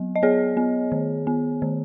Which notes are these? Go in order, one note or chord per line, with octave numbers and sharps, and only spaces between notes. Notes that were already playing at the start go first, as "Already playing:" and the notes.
Already playing: F#3 B3
D#5
B3 G#4 C#5
B3
D#3
B3
D#3